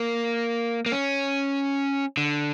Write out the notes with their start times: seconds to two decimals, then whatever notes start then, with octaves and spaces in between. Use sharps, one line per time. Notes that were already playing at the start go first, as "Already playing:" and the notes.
Already playing: A#3
0.86 A#3
0.92 C#4
2.17 D3